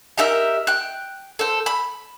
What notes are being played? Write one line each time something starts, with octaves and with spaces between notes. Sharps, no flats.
D#4 G4 A#4 E5
G5 F#6
A4 C5
B5